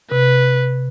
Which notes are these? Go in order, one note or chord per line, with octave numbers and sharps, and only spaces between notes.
C3 B4